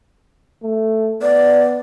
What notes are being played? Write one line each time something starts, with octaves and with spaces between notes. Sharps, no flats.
A3
B3 D5